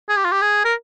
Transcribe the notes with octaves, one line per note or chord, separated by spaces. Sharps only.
G#4
G4
F4
G4
G#4
A#4